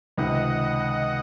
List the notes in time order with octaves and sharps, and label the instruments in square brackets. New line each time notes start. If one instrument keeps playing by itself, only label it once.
[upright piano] C#2 C3 D#3 [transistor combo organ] D#5 F#5